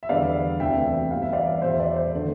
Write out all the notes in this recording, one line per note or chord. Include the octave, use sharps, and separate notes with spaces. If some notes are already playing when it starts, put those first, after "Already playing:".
E5
E2 D3 G3 B3 D5 F5
D2 C3 E3 B3 E5 G5
G2 E3 G3 B3 F5
E5
D5 F5
E2 B2 B3 C5 E5
D5
C5
D3 A3